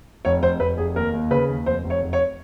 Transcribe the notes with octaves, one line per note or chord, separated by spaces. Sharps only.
F1 C#5
F1 C5
F1 B4
F1 G#4
D#2 A#4
D#2
C#3 B4
D#2
F1 C5
F1
C#5
F1
C#5